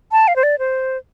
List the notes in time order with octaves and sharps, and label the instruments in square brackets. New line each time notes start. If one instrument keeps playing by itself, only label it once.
[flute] A5
F5
C5
D5
C5